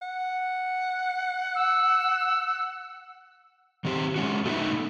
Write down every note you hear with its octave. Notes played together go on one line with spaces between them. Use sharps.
F#5
E6
D#3 C4 G4 C5
G#3 C#4 F#4
A3 B3 D#4 B4 E5